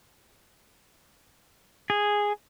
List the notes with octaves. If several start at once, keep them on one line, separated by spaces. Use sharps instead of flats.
G#4